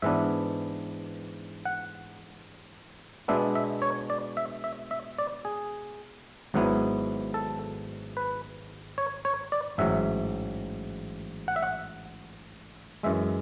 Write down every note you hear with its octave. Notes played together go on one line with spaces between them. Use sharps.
G#2 E3 B3 D4 E5
F#5
B2 G#3 B3 D4 E5
E5
C#5
D5
E5
E5
E5
D5
G#4
G#1 G#2 F#3 B3 E4
A4
B4
C#5
C#5
D5
A1 G#2 F#3 E5
F#5
E5
F#5
F#2 E3 G#3 E5